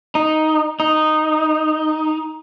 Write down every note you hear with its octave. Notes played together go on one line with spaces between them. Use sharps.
D#4
D#4